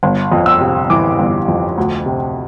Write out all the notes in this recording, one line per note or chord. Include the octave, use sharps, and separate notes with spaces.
G1
F2
E6
C3
E3 D6
G1
F2
D2
C3